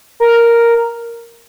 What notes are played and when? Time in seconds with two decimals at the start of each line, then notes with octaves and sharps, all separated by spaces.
0.20 A#4